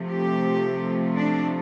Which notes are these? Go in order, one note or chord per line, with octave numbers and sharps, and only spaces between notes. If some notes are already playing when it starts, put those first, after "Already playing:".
Already playing: C3 F3 A3
G4
D4